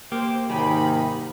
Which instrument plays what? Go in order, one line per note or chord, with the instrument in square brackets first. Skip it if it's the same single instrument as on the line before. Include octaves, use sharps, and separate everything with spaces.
[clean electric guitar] A#3 G4 [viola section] C5
[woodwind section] G#2 C3 D#3 [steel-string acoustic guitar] F#3 G5 G#5 [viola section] D#4 B5